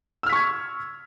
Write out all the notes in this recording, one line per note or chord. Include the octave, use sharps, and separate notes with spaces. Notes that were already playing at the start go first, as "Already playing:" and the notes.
C#6 E6 F6 G#6 B6